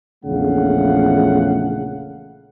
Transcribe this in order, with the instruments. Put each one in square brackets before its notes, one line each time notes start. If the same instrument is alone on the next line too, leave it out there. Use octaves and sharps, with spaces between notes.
[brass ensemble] A#1 E2 C#3 A3 F5 F#5